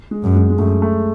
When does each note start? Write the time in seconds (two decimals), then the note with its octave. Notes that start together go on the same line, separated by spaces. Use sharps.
0.11 G#3
0.24 F#2
0.36 G#3
0.50 G#3
0.58 F#2 A3
0.82 A3